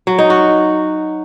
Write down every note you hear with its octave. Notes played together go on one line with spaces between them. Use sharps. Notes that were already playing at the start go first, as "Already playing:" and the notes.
F#3
D#4
F#4